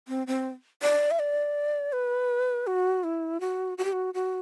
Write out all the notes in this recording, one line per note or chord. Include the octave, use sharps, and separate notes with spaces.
C4
C4
D5
E5
D5
B4
F#4
E4
F#4
F#4
G4
F#4
F#4